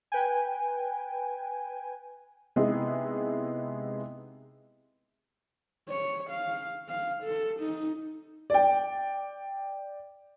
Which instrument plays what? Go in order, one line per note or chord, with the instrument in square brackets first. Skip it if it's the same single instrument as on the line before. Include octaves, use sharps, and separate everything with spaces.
[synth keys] B4 G5 G#5
[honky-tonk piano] C3 G#3 B3 D#4 E4 G#4
[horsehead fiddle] C#5
F5
F5
A4
D#4
[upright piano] D5 G5